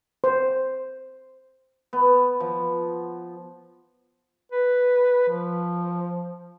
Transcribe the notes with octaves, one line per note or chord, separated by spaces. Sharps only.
C5
B3
F3
B4
F3